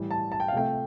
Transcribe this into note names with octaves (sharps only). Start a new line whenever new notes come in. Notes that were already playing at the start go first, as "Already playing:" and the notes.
Already playing: A2 E3 G3
A5
A5
G5
F5
C3 F3 A3 G5